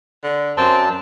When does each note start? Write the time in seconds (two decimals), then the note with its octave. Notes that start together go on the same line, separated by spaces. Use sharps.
0.24 D3
0.57 F#2 C4 A5